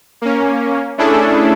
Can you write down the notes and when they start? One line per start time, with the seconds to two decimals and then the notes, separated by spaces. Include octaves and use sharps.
0.22 A#3 C#4
0.98 A3 C#4 D4 E4 G#4 A4